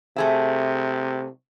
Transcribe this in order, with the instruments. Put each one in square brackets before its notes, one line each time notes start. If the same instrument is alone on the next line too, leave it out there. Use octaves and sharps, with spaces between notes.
[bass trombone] C3 [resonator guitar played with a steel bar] A3 G#4 E5